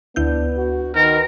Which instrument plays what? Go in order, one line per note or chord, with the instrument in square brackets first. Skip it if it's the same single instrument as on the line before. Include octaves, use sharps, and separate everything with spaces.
[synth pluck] D2 E4 G6 [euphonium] B3 [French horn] D4
[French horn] F#4
[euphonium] D#3 [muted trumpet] A#4 [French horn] B4